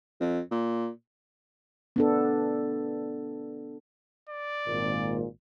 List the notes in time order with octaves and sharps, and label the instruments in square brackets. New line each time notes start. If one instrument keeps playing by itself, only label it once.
[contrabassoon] F2
A#2
[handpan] B3 D4 A4
[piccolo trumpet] D5
[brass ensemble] G#1 A#2